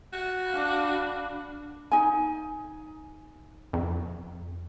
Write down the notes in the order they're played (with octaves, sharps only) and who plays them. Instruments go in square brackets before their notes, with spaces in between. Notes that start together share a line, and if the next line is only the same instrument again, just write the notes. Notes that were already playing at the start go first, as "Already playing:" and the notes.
[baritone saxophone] F#4
[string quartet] D4 F5 B5
[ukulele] D#4 G#5
[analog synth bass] F2